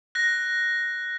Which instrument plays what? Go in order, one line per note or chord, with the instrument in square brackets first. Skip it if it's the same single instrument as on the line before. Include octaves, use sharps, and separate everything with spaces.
[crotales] F#6 A#6